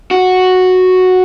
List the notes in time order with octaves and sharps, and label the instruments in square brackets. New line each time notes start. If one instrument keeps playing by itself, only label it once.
[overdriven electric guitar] F#4